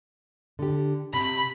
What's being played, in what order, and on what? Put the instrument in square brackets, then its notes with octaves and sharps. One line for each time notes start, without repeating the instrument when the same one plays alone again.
[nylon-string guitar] D3 G4
[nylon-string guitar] C3 [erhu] B5